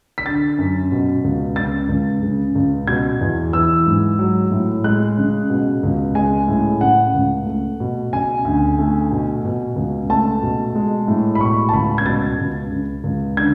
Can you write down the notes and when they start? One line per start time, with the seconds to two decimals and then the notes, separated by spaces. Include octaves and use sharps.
0.18 B6
0.25 D3 A6
0.58 F#2
0.92 B2
1.24 C#2
1.56 C#3 A6
1.89 C#2
2.22 C#3
2.55 C#2
2.87 B2 G#6
3.21 E2
3.53 E3 E6
3.87 G#2
4.19 F#3
4.52 A2
4.84 G#3 F#6
5.18 C#3
5.50 B2
5.83 C#2
6.15 G#3 G#5
6.48 A2
6.81 C#3 F#5
7.14 C#2
7.46 A3
7.80 B2
8.13 C#3 G#5
8.45 D2
8.79 A3
9.11 B2
9.44 B2
9.76 C#2
10.10 A3 A5
10.43 B2
10.75 G#3
11.08 A2
11.35 B5
11.41 B2 C#6
11.69 A5
11.73 C#2 B5
11.98 G#6
12.05 B2 A6
12.39 C#2
12.71 C#3
13.04 C#2
13.37 D3 G#6